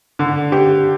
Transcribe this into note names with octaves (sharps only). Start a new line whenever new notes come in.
D3
G4